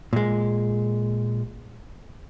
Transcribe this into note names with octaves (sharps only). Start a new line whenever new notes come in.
A#2 G#3